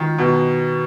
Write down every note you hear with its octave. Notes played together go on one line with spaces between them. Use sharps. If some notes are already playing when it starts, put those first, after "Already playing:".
Already playing: D#3
B2